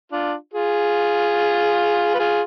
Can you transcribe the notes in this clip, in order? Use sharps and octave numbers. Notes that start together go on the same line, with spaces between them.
D4 F4
F4 G#4
B4
F4 G#4